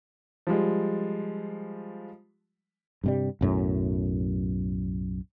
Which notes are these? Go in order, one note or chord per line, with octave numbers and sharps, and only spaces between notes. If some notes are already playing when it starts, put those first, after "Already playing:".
F3 G3 G#3
G2 C3 G3
B1 F#2 A2